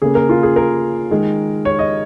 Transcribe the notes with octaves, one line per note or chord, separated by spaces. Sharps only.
C#3 A#3 G#4
A#4
F4
G#4
A#4
D#3 G#3
C#5
D#5